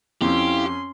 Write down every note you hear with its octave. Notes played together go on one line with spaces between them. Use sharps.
F2 C#4 E4 G4 F5 C6